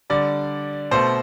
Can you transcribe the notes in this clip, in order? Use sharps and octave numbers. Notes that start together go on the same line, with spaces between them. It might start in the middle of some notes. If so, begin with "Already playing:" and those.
D3 G3 D5
B2 A3 C5